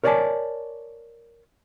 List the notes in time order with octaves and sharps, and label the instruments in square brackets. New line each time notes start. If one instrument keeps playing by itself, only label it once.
[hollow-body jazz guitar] A#4 C#5 D5 F5 G#5 A5